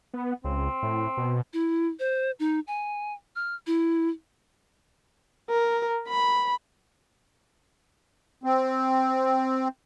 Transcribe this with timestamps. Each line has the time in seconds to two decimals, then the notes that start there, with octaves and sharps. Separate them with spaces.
0.14 B3
0.44 C#2 C4
0.83 A2
1.17 B2
1.53 E4
1.99 C5
2.39 D#4
2.67 G#5
3.36 F6
3.67 E4
5.50 A#4
6.09 B5
8.44 C4